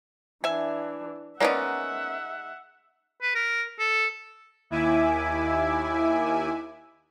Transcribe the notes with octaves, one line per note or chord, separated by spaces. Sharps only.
E3 D4 E5 G#5
G#3 A#3 B3 C#4 D#4 D5 E5 F#5
B4
A#4
A4
D#2 E4 E5 G#5 D6